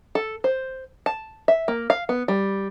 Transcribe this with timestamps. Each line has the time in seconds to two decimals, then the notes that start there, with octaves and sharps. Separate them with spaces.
0.15 A4
0.44 C5
1.06 A5
1.48 E5
1.68 A#3
1.90 F5
2.09 B3
2.28 G3